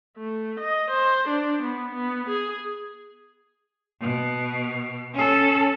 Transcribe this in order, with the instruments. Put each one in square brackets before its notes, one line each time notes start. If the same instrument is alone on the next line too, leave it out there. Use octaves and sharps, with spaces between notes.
[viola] A3
D#5
C5
D4
B3
B3
G#4
[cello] B2
C#4 A4